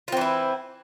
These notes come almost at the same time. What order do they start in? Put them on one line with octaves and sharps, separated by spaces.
F4 C4 E3 E4